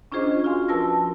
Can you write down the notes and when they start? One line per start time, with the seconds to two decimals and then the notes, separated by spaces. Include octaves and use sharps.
0.12 C#4 D4 F4 G#4 C5 D#5
0.44 F4 F#4 F5 G#5 C6
0.68 F3 A#4 B4 A5 E6 A#6